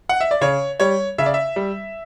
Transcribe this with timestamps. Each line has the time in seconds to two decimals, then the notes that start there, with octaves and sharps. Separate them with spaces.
0.09 F#5
0.21 E5
0.31 D5
0.41 C#3 C#5
0.80 G3 C#5
1.18 C#3 E5
1.26 D5
1.34 E5
1.56 G3